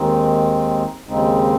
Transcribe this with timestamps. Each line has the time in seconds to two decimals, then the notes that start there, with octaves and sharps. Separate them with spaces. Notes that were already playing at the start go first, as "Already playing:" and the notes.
Already playing: D#2 D#3 G#3 C4 D#4
1.07 D#2 C#3 G#3 C4 D#4